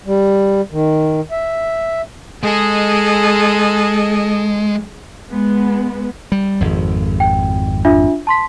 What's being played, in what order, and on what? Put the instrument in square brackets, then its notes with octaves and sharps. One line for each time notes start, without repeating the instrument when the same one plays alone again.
[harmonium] G3
D#3
E5
[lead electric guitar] G#3 [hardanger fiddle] G#4 [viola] A4 D#5
[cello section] G#3 B3
[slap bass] G3
G#1 F2
[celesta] G5
D4 F4 E5
A5 C6 B6